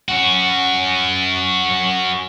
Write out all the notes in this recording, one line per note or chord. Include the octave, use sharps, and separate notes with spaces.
C#4 F#4